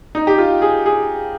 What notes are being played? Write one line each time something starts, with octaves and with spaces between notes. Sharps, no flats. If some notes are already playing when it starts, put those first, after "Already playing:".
D#4
G4
F4
G#4
G#4